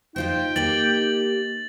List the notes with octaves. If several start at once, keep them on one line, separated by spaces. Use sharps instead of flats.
F3 D#4 F4 C5 G5
A#3 G4 A6 F#7